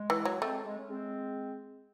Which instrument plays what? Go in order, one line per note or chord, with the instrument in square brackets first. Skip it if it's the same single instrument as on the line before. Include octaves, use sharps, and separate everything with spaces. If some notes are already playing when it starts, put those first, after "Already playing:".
Already playing: [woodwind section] G#3
[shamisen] E3
F#3
[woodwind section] G#3 C4 [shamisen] A3
[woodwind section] G#3
C#4
G#3 C4